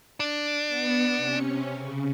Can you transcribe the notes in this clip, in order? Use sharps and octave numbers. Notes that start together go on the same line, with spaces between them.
D4
B3 C#7
C3 C#4
C#3